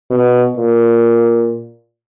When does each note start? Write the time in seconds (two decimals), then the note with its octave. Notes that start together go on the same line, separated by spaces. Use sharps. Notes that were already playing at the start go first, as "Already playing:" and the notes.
0.10 B2
0.57 A#2